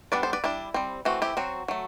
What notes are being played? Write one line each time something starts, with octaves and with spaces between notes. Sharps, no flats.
G3 B3 D4 B4 D5
A4 C5
B4 D5
G3 D4 E4
G3 C4
E3 A3 C4 F#4
E4 G4
F#3 C4 F#4
F#3 A3